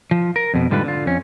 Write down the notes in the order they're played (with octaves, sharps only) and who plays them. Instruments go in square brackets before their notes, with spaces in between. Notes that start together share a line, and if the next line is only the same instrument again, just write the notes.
[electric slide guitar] F3
A#4
F2 B2
G#2 D3 G3 F4 B4
D3 F4
F2 C#4